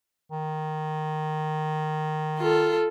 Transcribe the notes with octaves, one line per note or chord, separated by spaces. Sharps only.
D#3
F4 A4